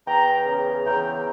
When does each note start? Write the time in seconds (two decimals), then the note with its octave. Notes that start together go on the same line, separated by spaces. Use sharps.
0.07 E2 G5 A#5
0.46 C#3
0.86 E2 G5 A#5